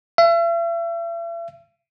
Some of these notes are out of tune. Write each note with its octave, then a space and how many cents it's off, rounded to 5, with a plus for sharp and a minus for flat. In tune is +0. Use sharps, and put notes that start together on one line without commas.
E5 +40